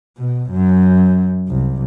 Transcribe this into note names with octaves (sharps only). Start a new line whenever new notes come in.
B2
F#2
C2